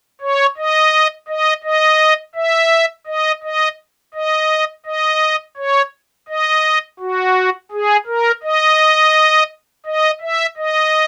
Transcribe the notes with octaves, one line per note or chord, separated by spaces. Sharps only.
C#5
D#5
D#5
D#5
E5
D#5
D#5
D#5
D#5
C#5
D#5
F#4
G#4
A#4
D#5
D#5
E5
D#5